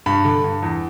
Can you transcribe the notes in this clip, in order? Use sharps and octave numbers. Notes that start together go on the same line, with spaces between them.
G2 B5
D3
G2
E2